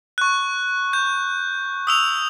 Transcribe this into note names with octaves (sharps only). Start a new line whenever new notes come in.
C#6 F#6
G6
D#6 E6 F7